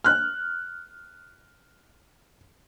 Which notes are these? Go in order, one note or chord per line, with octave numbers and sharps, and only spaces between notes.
F6 F#6